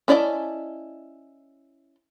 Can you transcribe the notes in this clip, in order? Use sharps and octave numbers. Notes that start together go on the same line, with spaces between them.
C#4 E4 D5 D#5 A5